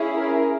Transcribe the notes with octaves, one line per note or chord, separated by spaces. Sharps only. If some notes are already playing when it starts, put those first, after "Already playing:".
Already playing: C#4 E4 G#4
A#4